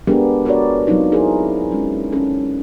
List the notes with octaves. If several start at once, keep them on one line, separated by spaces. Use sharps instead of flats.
G#3 B3 D4 G4 G#4 A#4
F#4 A#4 B4 C#5 D5
F#3 B3 C4 D#4 F4
E4 G#4 A#4 C5
G#3 C#4
C#4 A4